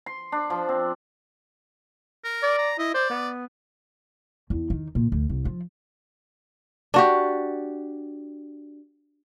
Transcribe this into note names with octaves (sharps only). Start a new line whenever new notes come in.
C6
D4
F3
C4
A#4
D5
A#5
E4 D#5
C5 D5
B3
E2
D#3
A#2
D2
C2
F3
D4 F#4 G4